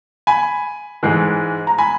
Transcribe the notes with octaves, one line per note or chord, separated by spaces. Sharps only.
G#5 B5
G#2 E3 G#3
A#5
G#5 B5